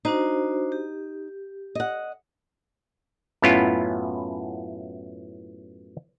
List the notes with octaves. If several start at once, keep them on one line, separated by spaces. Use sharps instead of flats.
D4 D#4 F#4 C5
G4
D#5 F#5
F#2 A2 B3 C#4 E4 F4